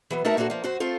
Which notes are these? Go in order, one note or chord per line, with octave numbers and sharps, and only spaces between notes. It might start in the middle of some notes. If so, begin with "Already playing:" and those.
E3 F#3 B3
A3 D#4 F#4 A#4 E5 A5
A#2 A#3 D4 F4 F#4 A4
F3 A#3
F#2 F#3 F#4 C5
A3 C4 F4 A4